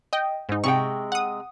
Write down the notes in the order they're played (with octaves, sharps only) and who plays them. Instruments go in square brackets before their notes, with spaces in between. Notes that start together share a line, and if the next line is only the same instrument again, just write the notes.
[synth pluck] D#5 G5
G#2 D#4
[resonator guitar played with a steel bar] C3 G#3 G5 [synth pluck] C#6
[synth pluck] F#5 D#6